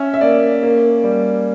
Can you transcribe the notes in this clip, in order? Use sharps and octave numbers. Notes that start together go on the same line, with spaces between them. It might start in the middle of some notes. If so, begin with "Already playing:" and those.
Already playing: C#4 E5
E5
A#3 D5
A#3
G3